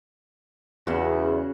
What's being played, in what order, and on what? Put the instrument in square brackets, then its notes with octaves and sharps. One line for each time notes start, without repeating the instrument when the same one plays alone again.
[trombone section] E2 [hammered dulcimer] C#3 F#4